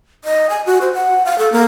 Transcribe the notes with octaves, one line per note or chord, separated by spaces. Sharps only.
D#5
G#5
F#4
C5
F#5
F5
A4
A#3